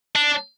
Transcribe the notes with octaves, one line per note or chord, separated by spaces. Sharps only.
D4